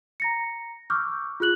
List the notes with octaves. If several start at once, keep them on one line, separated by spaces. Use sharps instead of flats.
A#5 A#6 C#7
C#6 D6 E6 F6 G6
F4 G#4 F#6 F#7